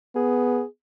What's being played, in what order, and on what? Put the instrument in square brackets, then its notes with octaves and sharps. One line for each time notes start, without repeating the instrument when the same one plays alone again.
[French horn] B3 [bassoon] G#4